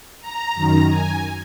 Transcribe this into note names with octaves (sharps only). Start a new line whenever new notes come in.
A#5
F#2 D#3
G#5